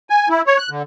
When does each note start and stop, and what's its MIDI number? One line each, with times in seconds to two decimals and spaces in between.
0.10 0.28 80
0.29 0.42 64
0.47 0.58 73
0.58 0.70 90
0.70 0.82 50